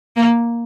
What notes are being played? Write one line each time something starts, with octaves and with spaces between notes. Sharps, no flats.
A#3